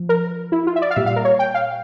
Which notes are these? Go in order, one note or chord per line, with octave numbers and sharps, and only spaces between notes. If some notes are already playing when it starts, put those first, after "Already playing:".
Already playing: F3
A#4
E4
F4
E5
D5
F5
A#2 G3 E5
F5
A#4
C#5
G5
F5